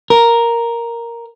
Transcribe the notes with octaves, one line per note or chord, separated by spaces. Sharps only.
A#4